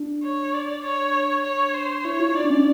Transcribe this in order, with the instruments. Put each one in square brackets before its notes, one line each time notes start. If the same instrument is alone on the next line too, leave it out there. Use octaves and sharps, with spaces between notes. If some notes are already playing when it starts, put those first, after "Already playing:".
Already playing: [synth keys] D4
[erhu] C#5
D5
C#5
C#5
C5
[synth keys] E4 [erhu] C#5
[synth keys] F4
[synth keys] D#4 [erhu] D5
[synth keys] D4
C#4